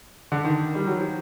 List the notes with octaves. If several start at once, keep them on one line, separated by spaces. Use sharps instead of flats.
D3
D#3
G3
F#3
F3